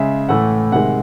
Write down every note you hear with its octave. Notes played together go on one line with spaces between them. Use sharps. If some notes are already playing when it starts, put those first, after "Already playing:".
Already playing: C#3 G#3 E5
A2 E3 A3 F#5
C3 D#3 G#3 F#5